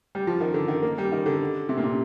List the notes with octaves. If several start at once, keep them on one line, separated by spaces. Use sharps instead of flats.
G3
F3
D#3
D3
D#3
A#3
G3
D#3
D3
C3
A#2
C3